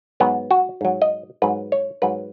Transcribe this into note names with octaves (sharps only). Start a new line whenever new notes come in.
G#2 F#3 B3
F#4
G#2 F#3
D#5
G#2 F#3 B4
C#5
G#2 F#3 B4